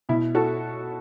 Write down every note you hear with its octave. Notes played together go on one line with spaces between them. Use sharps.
B2 E4
F#4 A4